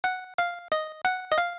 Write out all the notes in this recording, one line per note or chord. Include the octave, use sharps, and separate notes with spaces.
F#5
F5
D#5
F#5
D#5
F5